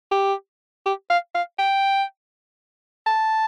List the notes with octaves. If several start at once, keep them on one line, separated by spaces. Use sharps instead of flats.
G4
G4
F5
F5
G5
A5